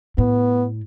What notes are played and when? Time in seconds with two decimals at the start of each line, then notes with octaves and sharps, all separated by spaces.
0.18 A2 B3